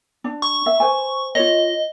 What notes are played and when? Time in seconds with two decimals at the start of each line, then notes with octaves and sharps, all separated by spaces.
0.24 D4
0.42 C#6
0.66 E5
0.80 B4 C5 G#5
1.35 F4 C#5 D#5